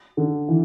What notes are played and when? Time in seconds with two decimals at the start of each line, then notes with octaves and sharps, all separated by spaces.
0.17 D3
0.48 E3